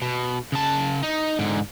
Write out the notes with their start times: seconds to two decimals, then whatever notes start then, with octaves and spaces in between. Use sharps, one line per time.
0.02 B2
0.52 C#3 A5
1.03 D#4
1.39 G#2 D3